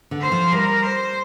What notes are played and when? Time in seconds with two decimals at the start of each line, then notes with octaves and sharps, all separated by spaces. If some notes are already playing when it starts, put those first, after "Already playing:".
0.11 D3
0.21 C5
0.32 F3
0.52 G3 A#4
0.83 C5